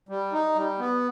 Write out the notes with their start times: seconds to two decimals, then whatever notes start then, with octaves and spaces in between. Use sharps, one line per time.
0.09 G3
0.33 D#4
0.55 G3
0.79 B3